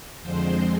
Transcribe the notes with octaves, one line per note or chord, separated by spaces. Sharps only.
F2 D3 F3 G#3 C4 C5